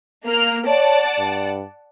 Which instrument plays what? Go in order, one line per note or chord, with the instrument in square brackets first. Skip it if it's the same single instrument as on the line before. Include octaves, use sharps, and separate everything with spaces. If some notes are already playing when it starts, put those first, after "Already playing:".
[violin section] A#3 F6
[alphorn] C#5 [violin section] D5 F#5 A5
[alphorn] G2